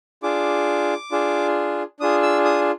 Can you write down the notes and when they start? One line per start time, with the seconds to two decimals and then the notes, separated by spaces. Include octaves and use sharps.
0.23 D4 F4 G#4 D6
1.12 D4 F4 G#4
2.00 D4 F4 G#4 D#6
2.22 E6
2.45 D#6